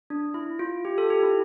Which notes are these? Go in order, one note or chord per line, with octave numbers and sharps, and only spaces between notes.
D4
E4
F4
G4
F4 A4
G4
E4